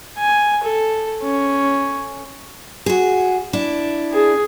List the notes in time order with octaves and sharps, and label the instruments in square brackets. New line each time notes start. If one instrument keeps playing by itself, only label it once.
[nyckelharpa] G#5
A4
C#4
[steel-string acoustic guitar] F#4 G#4
D4 E4
[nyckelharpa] G#4